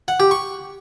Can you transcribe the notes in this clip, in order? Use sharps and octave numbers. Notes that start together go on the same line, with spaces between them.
F#5
G4
C#6